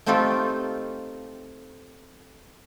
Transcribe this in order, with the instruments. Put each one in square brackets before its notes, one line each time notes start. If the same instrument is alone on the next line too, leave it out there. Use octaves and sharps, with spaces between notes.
[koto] A3 C4 D#4 F4 G4 A4